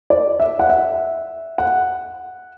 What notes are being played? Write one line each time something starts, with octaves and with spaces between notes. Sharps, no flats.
D5
E5
F#5
E5
F#5